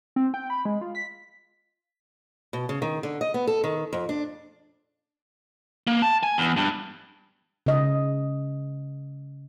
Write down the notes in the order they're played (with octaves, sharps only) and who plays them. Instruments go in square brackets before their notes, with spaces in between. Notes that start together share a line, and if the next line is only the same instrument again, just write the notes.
[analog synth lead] C4
G5
B5
G#3
F4
B6
[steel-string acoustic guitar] B2
C#3
D#3
D3
D#5
B3
A4
D#3
F2
D4
[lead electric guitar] A#3
A5
G#5
E2
G2
[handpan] C#3 D#5